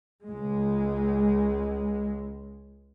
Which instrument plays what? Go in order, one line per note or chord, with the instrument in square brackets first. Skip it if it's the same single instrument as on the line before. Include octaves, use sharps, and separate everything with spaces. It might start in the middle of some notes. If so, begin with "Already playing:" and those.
[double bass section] C#2 G#3